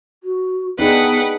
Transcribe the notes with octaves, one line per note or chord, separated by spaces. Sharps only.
F#4
B3 D4 D#4 G#4 B4 F#5 G5